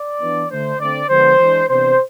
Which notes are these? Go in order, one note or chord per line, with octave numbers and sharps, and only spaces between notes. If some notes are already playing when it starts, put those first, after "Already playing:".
Already playing: D5
E3 B3 D4
D3 A3 D4 C5
D3 A3 C4 D5
D3 F3 G#3 B3 D4 C5
E3 G#3 D4
C3 E3 B3 D4 C5